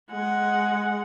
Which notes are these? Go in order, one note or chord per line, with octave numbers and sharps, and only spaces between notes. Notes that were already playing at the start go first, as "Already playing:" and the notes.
G#3 F#5